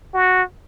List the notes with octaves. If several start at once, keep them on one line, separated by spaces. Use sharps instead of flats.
F#4